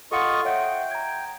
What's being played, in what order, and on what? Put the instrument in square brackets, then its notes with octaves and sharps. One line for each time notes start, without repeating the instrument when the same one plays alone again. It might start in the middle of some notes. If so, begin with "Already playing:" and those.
[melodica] F4 D#5 C#6 [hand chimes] A4 F#5 C#7
[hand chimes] C#5 E5 F#5 [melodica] G5
[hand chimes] A#5 G#6